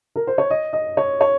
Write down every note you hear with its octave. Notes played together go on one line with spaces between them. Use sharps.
A#4
C5
C#5
D#5
D#5
C#5
C#5